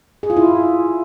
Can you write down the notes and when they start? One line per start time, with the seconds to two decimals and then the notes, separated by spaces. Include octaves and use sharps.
0.23 G#4
0.30 F4
0.37 E4